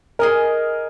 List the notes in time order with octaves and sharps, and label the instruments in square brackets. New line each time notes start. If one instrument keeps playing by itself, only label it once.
[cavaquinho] G#4 D#5 G#5 [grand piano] A#4